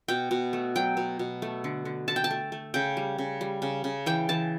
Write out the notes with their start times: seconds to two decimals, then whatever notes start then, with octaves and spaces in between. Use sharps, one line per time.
0.08 B2 G5
0.31 B2
0.53 A3
0.75 F#3 G5
0.97 B2
1.19 B2
1.42 A3
1.64 D3
1.85 D3
2.08 D3 A5
2.16 G5
2.24 A5
2.31 A3
2.52 A3
2.74 C#3 G5
2.97 G3
3.19 C#3
3.41 G3
3.62 C#3
3.84 C#3
4.06 E3 G5
4.29 E3 A5